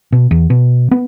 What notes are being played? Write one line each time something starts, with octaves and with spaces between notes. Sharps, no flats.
B2
E2
B2
B3